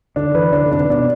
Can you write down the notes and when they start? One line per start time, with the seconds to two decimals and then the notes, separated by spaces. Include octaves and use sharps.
0.16 D3 D4
0.35 E3 B4
0.52 D3 D4
0.66 D3
0.71 C3 D4
0.89 B2 D4